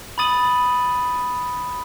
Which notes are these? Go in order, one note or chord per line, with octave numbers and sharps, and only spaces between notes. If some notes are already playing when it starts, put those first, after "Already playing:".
B5 D#6 A6 D#7 F#7